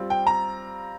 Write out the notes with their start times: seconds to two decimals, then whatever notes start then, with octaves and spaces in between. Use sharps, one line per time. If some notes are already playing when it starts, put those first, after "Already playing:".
Already playing: G3 C4 F4
0.10 G5
0.27 A#5